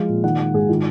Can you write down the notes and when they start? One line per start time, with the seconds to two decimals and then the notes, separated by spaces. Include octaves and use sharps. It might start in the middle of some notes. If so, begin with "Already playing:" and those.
Already playing: F3 G#3 F5
0.09 A#2
0.23 D#3 F#5
0.38 G#3 F#5
0.54 G#2 G#4
0.69 D#3 F4